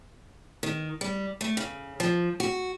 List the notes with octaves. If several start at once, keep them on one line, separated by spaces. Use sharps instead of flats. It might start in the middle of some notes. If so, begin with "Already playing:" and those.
D#3
G3
A3
C#3
F3
F#4